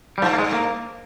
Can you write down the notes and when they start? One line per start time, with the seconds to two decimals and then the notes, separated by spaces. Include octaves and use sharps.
0.18 G3
0.22 G2 F3
0.33 A#3
0.38 G#3
0.53 A#3